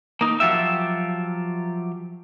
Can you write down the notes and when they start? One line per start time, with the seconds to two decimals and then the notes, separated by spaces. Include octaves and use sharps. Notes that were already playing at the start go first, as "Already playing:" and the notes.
0.21 A#3 D#4
0.40 F3 F#3 F4 G4 E5